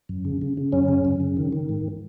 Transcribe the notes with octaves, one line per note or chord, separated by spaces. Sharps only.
F#2
C#3
C#3
C#3
F#2 C#4
C#3
F#2
C#3
D#3
D#3
G#2